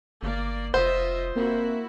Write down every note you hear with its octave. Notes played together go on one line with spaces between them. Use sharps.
G1 A#3 D5
F1 F4 C5 D#5 E5
A#3 C4 E4 F#4